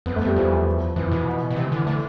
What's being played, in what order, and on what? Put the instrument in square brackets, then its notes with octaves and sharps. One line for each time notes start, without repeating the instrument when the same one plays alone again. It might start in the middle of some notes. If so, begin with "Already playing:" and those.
[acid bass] F2 [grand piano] B3
[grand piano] A3
[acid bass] F2 [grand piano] G3
[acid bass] E2 [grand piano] F3
[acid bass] F2 [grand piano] E3
[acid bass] B2
B2
[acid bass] C3 [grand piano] E3
[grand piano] E3
[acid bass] D3
[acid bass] D3 [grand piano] A3